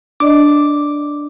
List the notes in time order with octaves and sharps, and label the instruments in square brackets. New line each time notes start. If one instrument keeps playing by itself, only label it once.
[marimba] D4 D5 D#5 [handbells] D6